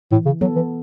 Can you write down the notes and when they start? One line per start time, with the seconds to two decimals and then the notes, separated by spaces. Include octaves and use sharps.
0.11 A2 E3
0.26 C#3
0.41 F#3 B3 A4
0.56 E3